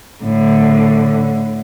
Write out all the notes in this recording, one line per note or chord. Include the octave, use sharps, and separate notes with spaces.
A2 D3